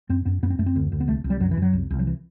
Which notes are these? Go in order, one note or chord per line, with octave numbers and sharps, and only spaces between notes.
F#2 C4
F#2 B3
F#2 B3
C4
F#2 A3
C4
D2
D2
B3
C2 A3
C2
G3
F#2 F#3
E3
F#2 F#3
C2
C2
F#3
E3